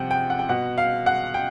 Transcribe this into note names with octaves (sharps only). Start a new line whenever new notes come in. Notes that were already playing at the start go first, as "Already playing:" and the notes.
Already playing: C3 F3 F#5 G5
G5
F#5
G5
B2 F#5
F5
F#5
G5